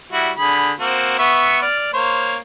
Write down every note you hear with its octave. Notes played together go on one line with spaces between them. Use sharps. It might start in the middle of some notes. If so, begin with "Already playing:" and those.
G3 E4 F#4
D3 G#4 B5
A#3 C4 F#4
B3 E5 C#6
D5 F6
A#3 C5 C#5